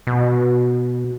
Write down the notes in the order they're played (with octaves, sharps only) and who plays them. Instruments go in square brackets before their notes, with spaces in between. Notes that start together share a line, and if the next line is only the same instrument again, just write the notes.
[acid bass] B2